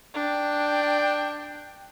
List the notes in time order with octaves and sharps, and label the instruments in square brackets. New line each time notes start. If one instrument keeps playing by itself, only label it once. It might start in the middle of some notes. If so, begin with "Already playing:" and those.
[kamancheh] D4 G5